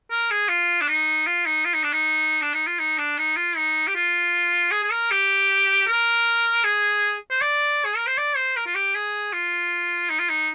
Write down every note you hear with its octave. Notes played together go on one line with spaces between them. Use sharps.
A#4
G#4
F4
D4
D#4
F4
D#4
F4
D#4
D4
D#4
D4
D#4
F4
D#4
D4
D#4
F4
D#4
G4
F4
G#4
G#4
A#4
G4
A#4
G#4
C5
D5
G#4
A#4
C5
D5
C5
A#4
F4
G4
G#4
F4
D#4
F4
D#4